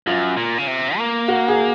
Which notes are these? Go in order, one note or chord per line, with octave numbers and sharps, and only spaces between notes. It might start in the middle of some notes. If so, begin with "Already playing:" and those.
F#2 F4
A#2
C#3
C3
A#3
F#4
G#4